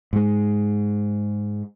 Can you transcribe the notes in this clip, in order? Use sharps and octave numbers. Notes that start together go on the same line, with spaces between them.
G#2 G#3